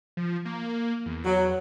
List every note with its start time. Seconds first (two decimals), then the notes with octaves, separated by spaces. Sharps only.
0.17 F3
0.45 A#3
1.06 E2
1.26 F#3